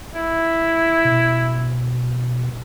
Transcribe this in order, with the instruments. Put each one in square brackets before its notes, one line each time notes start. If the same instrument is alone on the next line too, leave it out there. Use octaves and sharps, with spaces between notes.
[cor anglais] E4
[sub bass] B2